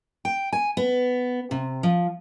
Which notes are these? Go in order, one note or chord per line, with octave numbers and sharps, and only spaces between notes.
G5
G#5
B3
C3
F3